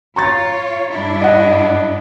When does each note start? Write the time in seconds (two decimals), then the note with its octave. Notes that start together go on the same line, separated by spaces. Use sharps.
0.16 F4 C#5 A#5 C#6 A6
0.90 G2 D4 E4
1.22 D#5 F#5